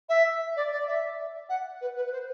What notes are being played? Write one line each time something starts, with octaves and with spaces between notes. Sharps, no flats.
E5
D5
D5
E5
F#5
B4
B4
B4
C5